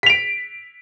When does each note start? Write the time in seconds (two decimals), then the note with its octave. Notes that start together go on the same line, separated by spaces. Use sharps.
0.03 B6
0.06 F7
0.10 D7